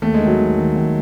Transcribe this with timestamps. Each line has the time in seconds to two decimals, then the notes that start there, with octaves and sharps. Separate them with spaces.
0.02 D#2 A3
0.14 G#3
0.20 D#3
0.27 F#3
0.39 D#2
0.58 D#3
0.76 D#2